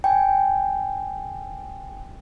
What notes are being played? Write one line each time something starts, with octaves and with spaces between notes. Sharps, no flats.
G5 G#5